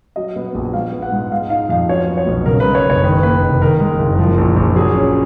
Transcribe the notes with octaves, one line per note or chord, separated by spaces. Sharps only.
F#3 D#5
B3
A#1
G#3 F5
B3
F#5
G#2
G#3 F5
D#4 F5
F2 F5
F#3 C#5
B3
C#5
B1
C#3 A#4
B4
G#3
C#5
F#1 C#5
D#3 B4
A#3 B4
F1
D#3 A#4
G#3
F#1
F3
A#1
A#1
F#3 G#4
C#4